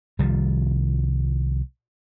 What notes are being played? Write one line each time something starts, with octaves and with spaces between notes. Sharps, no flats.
C2 D#3 F3 G3